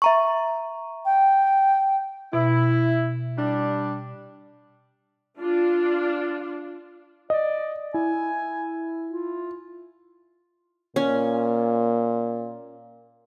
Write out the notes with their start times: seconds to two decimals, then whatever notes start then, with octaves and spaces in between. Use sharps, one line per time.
0.02 E5 A#5 C#6
1.05 G5
2.33 B2 E4
3.38 G3 D4
5.39 D4 F4
7.30 D5 D#5
7.94 E4 G#5
9.10 F4
10.96 A#2 C#4